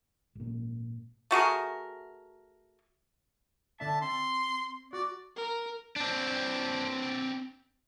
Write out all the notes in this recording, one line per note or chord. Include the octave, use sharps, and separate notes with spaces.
G#1 A#2
A3 F#4 G#4 A#4
D3 D4 E5 A5
C4 C6
F#4 D5
A#4
C4 D4